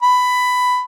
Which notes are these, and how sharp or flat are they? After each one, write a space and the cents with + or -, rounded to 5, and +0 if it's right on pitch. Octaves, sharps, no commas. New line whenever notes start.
B5 +10